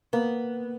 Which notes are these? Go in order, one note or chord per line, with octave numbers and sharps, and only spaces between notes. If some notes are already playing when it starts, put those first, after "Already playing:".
A#3 B3